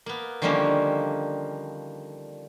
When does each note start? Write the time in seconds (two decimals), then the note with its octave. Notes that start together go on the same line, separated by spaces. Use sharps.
0.06 A#3 B3
0.42 D3 D#3 F3 G3 A#3 C#4